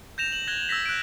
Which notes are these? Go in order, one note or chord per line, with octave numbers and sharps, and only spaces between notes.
G6 A#6 E7 F7
E7 F#7
F#6 G#6 A#6 G7
E6 G#6 A#6 B6
F#6 D7